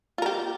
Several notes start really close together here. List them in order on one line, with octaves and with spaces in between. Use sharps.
F4 A#4 G4